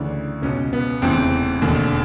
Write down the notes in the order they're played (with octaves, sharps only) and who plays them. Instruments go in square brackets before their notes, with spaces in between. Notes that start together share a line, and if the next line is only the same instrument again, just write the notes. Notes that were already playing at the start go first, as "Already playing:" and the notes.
Already playing: [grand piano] D2 C#3 E3 D4
C#2 B2 C#4
B3
F1 E2 C#3 E3 C4
E1 D#2 D3